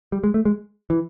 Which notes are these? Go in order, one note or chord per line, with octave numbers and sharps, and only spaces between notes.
G3
G#3
A3
G#3
E3